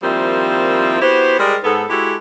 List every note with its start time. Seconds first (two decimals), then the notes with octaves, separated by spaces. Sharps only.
0.03 D#3 F3 G3 A#3 C4 E4
1.02 B3 E4 F#4 G4 C5
1.39 G3 G#3 A#4
1.64 G#2 B3 A4
1.90 G#3 E4 F#4 G4 A4